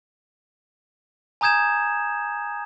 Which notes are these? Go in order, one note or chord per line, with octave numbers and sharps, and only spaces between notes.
G#5 A#5 D#6 G6 G#6 E7